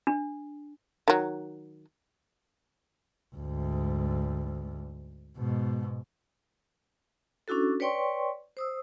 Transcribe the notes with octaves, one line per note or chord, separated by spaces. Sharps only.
D4
D#3 F#3
D2 G#2
G#2 B2
C#4 D4 E4 F#4 A4
B4 C#5 D5 G5 C6 C#6
C5 D#6 E6